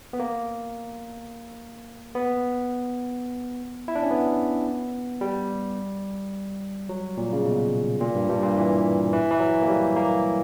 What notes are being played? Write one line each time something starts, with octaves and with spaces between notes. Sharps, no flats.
B3
A#3
B3
E4
D4
C#4
B3
G3
F#3
A#2
C#3
B2
A#2
G2
G2
A#2
E3
E3
E3
F#3
A#3
G3
A#3